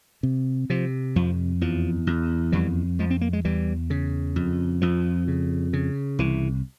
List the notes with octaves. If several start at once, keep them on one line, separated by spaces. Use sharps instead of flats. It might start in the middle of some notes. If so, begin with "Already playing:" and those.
C3
C3 F3
F2 F3
E2 F3
E2
F2 E3 G3
F2 F3 G#3
C4
A#3
G#3
E2 E3 G3
C#3
F2
F2 F3
C#3
C#3
C2 E3